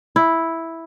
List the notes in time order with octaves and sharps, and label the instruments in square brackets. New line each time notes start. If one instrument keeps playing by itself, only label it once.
[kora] E4